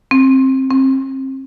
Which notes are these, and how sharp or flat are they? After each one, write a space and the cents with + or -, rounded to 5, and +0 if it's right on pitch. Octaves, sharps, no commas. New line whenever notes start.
C4 +20
C4 +35